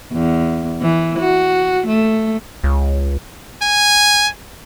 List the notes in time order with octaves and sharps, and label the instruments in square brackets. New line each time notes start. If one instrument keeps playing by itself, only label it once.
[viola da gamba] E2
E3
F#4
A3
[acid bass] C#2
[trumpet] G#5